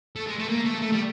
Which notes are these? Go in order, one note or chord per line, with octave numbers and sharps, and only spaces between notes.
A3
G#3
A3
A#3
A3
A3
G3